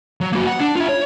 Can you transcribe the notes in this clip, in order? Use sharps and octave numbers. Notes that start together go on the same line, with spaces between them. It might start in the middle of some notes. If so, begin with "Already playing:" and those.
F#3
A#3 F#4
F#5
D4
F4 E5
C#5